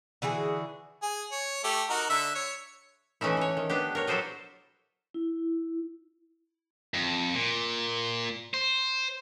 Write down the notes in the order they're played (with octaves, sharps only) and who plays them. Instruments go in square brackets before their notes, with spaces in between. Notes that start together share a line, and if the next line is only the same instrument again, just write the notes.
[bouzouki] D3 E3 F#4 G#4
[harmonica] G#4
C#5
A3 G4
D#4 F#4 A#4
D3 E5
C#5
[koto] E3 A3 C#4 D#4 E4
E3 C#5
D#3
B3 D4 G4
A#4 C#5
F#3 E4 A4 C5 D5 D#5
[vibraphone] E4
[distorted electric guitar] F2
A#2
C5